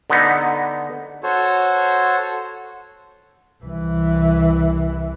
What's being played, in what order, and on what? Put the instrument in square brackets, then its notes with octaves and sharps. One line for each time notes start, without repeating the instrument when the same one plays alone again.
[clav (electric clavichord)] D3 B3 D#4
[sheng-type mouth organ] F#4 A4 C5 C#5
[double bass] C2 E3